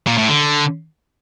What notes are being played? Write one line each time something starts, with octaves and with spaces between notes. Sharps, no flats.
A#2
A2
D3